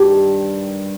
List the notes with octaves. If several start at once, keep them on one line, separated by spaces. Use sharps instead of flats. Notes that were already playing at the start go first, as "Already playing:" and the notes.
Already playing: G2 D#3 G3